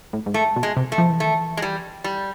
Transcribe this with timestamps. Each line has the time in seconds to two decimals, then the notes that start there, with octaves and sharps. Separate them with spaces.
0.13 A2
0.26 G#2
0.34 A2 A3
0.56 B2
0.63 G#3
0.77 C3
0.92 A3
0.98 F3
1.10 E3
1.20 D#3 A3
1.33 E3
1.57 G#3
1.62 G3
2.04 G3